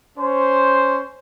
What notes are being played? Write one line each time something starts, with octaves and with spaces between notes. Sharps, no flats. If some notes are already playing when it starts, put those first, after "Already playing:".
C#4 C5